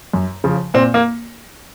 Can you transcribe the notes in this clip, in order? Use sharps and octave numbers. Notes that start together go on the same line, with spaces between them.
F#2
C#3 F3
A#2 C4
A#3